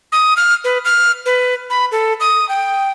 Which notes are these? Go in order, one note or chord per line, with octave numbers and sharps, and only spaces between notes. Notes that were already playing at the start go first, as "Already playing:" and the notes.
D#6
F6
B4
F6
B4
B5
A4
D#6
G5